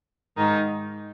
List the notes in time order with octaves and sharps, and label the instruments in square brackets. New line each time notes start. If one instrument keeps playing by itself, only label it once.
[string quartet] G#2 D#3 D#4